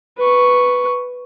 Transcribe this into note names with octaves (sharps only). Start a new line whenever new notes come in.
B4 C#6